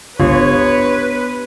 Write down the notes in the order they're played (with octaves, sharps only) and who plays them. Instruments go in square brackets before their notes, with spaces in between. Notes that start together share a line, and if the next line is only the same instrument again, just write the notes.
[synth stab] G1 C#2 F4 [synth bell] B3 D4 G4 [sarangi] B4 [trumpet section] C#5